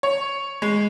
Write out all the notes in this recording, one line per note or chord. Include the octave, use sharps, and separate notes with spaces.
C#5
G#3